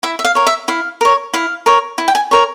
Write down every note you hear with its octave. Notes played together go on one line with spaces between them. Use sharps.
E4 E5
E5
F5
A#4 C#5
E5
E4 F5
A#4 C#5
E4 F5
A#4 C#5
E4
G5
G#5
A#4 C#5